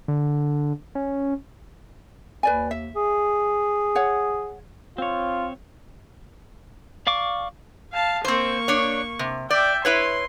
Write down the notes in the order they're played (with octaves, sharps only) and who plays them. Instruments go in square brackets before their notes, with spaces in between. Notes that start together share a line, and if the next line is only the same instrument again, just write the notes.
[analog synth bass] D3
C#4
[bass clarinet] D#2 [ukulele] B4 D5 G#5
[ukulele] E5
[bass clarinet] G#4
[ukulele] C#5 F#5
[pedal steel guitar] C4 C#5 [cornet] F4
[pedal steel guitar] D5 F5 C#6 D6
[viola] F5 A5
[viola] A#3 C#6 [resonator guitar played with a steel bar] C4 C5
[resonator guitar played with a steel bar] D4 C#5
C3
[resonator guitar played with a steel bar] D5 [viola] E5 G5
[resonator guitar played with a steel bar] E4 B4 C#5 [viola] C6